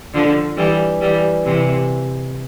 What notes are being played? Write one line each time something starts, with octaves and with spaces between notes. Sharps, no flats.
D3 F3
E3 G3
E3 G3
C3 E3